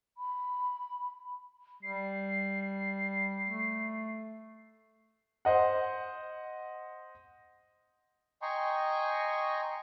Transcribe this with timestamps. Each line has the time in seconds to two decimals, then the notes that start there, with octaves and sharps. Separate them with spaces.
0.18 B5
1.83 G3 C7
3.47 A3
5.45 C5 D#5 F#5
8.42 D#5 G5 G#5 A#5 C6 C#6